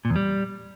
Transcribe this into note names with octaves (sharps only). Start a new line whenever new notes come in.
A#2
E2
G3